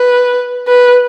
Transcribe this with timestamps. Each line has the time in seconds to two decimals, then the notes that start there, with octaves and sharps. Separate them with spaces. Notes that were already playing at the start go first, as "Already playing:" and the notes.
Already playing: B4
0.68 B4